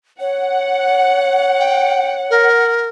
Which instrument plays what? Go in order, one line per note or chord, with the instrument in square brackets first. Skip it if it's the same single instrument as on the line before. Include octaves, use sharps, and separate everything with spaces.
[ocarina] C#5 [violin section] F#5
[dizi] G5
A#4